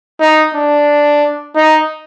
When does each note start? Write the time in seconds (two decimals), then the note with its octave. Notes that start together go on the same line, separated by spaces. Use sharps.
0.20 D#4
0.54 D4
1.56 D#4